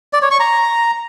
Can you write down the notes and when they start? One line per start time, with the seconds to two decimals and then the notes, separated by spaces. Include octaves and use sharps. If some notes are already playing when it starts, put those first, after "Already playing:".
0.13 D5
0.22 C#5
0.31 C#6
0.40 A#5